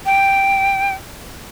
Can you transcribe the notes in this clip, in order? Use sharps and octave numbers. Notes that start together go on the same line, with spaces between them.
G5